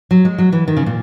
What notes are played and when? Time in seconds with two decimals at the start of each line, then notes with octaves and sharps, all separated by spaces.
0.11 F#3
0.25 G#3
0.38 F#3
0.52 E3
0.68 D#3
0.77 C#3
0.86 A#2